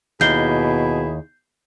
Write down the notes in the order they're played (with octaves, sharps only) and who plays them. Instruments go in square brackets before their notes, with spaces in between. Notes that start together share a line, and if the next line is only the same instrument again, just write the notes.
[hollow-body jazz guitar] D#2 [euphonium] B2 [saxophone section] E4 G#4 [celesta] G6 C7 G7